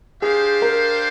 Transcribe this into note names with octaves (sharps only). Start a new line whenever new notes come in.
D4 G4 G#4 C5 F5
A#4